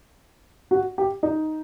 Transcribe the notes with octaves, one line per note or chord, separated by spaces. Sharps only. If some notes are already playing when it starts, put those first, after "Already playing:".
F#4
G4
D#4